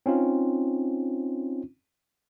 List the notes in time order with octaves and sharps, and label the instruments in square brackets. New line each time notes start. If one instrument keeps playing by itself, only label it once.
[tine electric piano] C4 C#4 D#4 F4